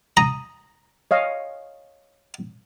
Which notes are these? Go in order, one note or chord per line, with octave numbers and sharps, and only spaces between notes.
A#5 D#6
C#5 D#5 F5